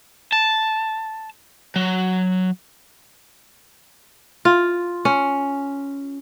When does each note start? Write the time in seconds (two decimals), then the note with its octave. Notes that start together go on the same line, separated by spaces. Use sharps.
0.32 A5
1.76 F#3
4.45 F4
5.05 C#4